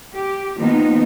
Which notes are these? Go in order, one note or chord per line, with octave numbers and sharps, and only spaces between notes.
G4
D#3 F3 A#3 B3 D#4